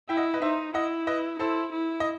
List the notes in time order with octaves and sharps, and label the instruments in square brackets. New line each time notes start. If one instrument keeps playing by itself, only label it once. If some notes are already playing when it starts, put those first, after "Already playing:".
[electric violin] E4 [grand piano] E5 G5
[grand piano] D#5 F#5
B4 D#5
[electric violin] D#4 [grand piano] C5 E5
[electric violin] E4 [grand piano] D#5 F#5
[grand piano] B4 D#5
[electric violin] E4 [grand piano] A4 C5
[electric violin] E4
[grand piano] D#5